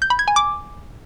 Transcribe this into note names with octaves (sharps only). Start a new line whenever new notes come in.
G6
B5
G#6
G#5
D6